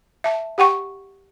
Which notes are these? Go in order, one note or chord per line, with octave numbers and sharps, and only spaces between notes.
E5 A5
G4 F#5 G5 C#6